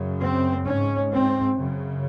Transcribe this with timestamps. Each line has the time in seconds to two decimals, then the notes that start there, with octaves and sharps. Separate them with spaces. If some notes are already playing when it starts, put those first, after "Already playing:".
Already playing: F#2 C#3
0.23 C4
0.67 G#2 C#4
1.11 C4
1.57 F#2 C#3